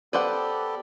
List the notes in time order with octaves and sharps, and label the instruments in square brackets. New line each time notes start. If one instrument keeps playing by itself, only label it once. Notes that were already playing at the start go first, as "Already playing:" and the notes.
[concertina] B3 G4 A4 [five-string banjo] B4 C5 F#5 [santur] D5